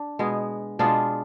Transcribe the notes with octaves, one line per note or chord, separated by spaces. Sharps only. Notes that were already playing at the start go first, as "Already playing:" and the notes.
Already playing: D4
B2 G#3 B3
B2 G#3 B3 D4 F4